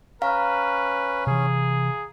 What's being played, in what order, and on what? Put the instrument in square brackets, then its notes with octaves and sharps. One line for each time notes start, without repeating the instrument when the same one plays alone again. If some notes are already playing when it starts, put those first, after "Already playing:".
[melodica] C#4 [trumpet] B4 [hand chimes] F5 A#5
[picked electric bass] C3 E3 [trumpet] G#4